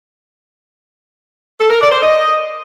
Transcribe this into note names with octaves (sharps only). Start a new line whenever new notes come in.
A4
A#4
D5
C5
D#5